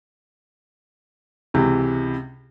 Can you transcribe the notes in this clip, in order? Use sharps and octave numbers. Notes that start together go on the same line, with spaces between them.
C#2 C3 E3